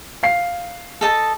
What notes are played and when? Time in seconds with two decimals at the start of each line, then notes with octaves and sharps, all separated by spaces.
0.23 F5 C7
1.01 A4 D#5 A5